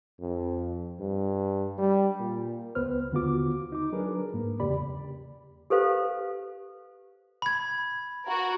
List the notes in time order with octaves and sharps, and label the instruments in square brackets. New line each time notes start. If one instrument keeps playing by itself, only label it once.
[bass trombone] F2
G2
G3
A#2
[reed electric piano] C#2 B3 B4 C5 F6
D#2 D3 B3 F4 F#4 D6
D#4 D6
F#3 D4 G#4 A#4 B4
G#2 A#3
E2 C#3 G4 D5 B5
[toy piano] G4 A4 B4 C5 F5
[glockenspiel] B5 G#6
[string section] F#4 A#4